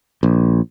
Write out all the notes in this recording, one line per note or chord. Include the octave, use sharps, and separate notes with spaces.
A#1